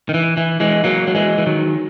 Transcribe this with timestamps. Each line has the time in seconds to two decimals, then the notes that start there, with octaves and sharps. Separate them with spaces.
0.09 D#3
0.14 E3
0.37 E3
0.60 E3 G#3
0.84 F#3 A#3
1.07 F#3
1.15 E3 G#3
1.38 E3
1.46 D#3 F#3